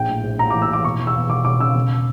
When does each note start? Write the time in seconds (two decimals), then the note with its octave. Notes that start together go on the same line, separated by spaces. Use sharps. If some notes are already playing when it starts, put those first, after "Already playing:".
Already playing: A#1 G5
0.08 A2
0.24 A#1
0.39 A2 A#5
0.50 D6
0.54 E3
0.62 E6
0.70 E3 D6
0.84 E1 C#6
0.99 E1
1.07 E6
1.14 E2
1.29 E1 D6
1.44 E1 D6
1.60 C#3 E6
1.75 E1